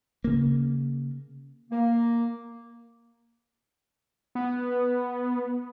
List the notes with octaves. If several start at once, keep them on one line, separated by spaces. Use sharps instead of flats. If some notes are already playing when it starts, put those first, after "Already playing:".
C#3 A#3
A#3
B3